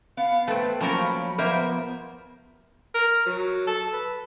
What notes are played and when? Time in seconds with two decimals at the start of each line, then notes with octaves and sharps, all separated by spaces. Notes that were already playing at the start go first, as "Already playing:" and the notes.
0.17 B3 F5
0.48 A3 C4 B4
0.81 F3 F#3 A3 A#3 C#4 A#4 B5
1.38 F3 A#3 B3 A#4 C5 E5
2.94 A#4
3.26 F#3
3.67 A4
3.93 B4